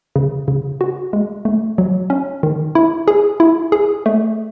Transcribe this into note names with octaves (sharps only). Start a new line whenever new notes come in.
C#3
C#3
F#4
G#3
A3
F#3
C#4
D#3
E4
G#4
E4
G#4
A3